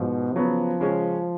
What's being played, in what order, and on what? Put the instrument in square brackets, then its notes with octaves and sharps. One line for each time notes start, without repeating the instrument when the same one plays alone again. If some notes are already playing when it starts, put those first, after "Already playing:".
Already playing: [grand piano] G#2 F3 [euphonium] B2
[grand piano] C#3 F#3 B3 [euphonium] F3
[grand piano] C#3 G#3 C#4